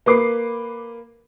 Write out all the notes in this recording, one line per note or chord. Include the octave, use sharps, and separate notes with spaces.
A#3 B4 D6 C7